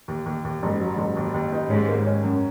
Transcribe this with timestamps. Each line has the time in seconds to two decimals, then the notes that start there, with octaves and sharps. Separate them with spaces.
0.08 D#2
0.26 D#2
0.45 D#2
0.62 F#1 G#2
0.80 F#3
0.98 F#1
1.16 D#2
1.34 D#2
1.52 D#4
1.70 G#2 C#4
1.88 A#3
2.06 C#4
2.24 F#2